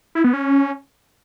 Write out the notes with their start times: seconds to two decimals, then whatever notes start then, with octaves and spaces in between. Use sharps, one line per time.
0.15 E4
0.24 B3
0.33 C#4